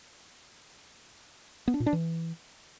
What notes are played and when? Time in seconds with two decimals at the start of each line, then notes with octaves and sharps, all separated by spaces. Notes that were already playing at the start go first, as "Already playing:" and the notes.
1.68 B3
1.74 D4
1.80 A#2
1.86 D4
1.93 E3